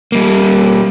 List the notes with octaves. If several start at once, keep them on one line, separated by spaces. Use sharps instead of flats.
G3 A#3